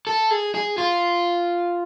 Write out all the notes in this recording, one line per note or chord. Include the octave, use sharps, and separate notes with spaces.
A4
G#4
G#4
F4